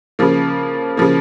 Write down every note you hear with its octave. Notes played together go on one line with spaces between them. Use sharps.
C#3 F3 A#3
C#3 F3 A#3